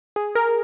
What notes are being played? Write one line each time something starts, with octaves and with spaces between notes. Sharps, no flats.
G#4
A#4